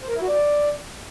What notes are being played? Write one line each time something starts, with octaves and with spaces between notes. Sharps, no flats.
C5
A#4
E4
F#4
D5